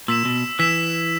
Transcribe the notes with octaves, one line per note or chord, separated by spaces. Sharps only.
A#2 E6 B6 E7
B2
E3 E6 B6 E7